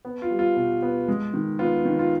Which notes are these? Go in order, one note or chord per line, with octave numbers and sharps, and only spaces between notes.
B3
F4
G3
F4
B2
B3
G#3
D#3
B3 F4
D#3
F4